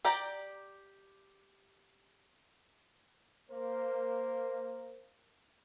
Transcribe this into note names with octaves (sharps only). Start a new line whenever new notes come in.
G4 D5 G5 A#5
A#3 A#4 C5